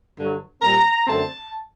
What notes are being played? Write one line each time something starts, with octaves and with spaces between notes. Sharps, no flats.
G2 D3 F#3
A#2 G3 C4 A#5
F#2 D3 A3 C4 A5